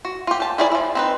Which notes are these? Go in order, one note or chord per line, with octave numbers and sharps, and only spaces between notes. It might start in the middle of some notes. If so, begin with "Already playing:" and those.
F#4
F4 G4
G4 A5
G3 E4 G#4 A#4 D5
F3 E4
C4 D#4 B4